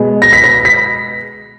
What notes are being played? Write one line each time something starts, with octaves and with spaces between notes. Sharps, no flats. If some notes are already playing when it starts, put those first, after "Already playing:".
Already playing: B2 G#3 B3
A#6
B6
A#6
B6